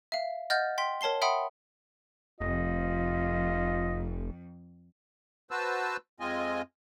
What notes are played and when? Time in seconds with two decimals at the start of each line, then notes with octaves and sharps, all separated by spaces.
0.12 E5 F5
0.50 D#5 F#5 F6 G6 A6
0.78 G5 C6 B6
1.01 A#4 C#5 A5 C7 G7
1.22 E5 F#5 G5 B5 C6 D#6
2.41 F1 F2 F4 D#5
5.51 F#4 B4 C5 A5 E6
6.20 F2 G#3 C4 F4 D#5 G#5